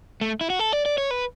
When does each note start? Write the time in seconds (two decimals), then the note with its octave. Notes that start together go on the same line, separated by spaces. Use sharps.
0.21 A3
0.41 E4
0.50 F#4
0.60 A4
0.72 D5
0.86 D5
0.98 C#5
1.11 B4